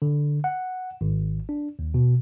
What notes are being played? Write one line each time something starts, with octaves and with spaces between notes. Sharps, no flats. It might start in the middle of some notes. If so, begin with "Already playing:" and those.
D3
F#5
G#1
D4
D#2
B2